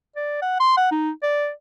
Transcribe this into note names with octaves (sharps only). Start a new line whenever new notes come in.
D5
F#5
C6
F#5
D#4
D5